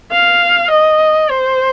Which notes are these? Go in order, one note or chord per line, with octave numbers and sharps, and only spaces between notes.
F5
D#5
C5